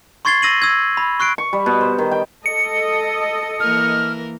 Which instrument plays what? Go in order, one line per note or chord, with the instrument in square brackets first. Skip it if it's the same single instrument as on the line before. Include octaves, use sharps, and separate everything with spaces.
[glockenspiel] C6 C#6 G#6 A6 C7 G7
E6 A#6 D#7 F#7
E6 G#6
B5
C#6 F#6 C7 D7
[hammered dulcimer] C#6
G3
B2
C5
D#3
G5
[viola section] A4 D#5 [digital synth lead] C#7
[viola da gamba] E3 A#3 A#4 [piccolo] F6